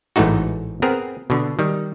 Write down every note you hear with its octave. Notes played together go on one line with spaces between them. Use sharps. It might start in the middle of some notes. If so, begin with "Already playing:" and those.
A1 G#2 E3 A3 D#4 F#4
B3 C4 G#4 A#4
B2 D3
D#3 G3